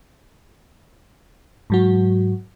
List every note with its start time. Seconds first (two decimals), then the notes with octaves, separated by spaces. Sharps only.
1.70 G#2 F#3 F#4